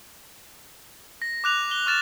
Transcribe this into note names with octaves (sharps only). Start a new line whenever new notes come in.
A#6
D6 F#6 F7
G7
C#6 F6 A6 E7